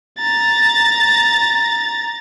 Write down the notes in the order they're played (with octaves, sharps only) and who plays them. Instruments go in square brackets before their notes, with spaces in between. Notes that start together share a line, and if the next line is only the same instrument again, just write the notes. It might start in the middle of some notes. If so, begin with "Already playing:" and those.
[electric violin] A#5 A6